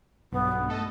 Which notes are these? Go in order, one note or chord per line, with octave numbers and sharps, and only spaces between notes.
B1 G2 B3
A3 A4 D#5